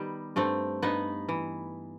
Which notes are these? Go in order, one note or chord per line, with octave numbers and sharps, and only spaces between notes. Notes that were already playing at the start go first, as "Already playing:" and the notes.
Already playing: D#3 G3 B3 D#4
G2 A3 C4
G2 B3 D#4
E3